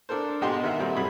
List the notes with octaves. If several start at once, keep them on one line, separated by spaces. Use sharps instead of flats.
D4 A4 A#4 C5
G#2 B2 G#3 G4 D#5 C6
D#3 A#4 E5 F#5
A#2 G3 A3 C4
F#2 C3 G3 A3 G#4 B5